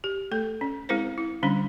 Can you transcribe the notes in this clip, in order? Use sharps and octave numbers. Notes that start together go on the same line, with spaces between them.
G4
A3 A4
C#4
G#3 C4 E4 G#4 A#4 C5
E4
D3 G3 C#4 D4